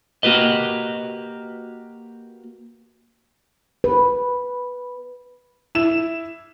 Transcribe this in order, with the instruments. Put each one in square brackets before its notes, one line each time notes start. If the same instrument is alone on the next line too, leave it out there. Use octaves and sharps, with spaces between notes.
[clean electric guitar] A#3 F#4 G4 B4 D#5
[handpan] B4
[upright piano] E4 E7